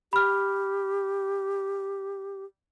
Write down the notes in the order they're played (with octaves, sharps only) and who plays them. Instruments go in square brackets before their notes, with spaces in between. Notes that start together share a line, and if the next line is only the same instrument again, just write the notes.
[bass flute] G4 [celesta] B5 F6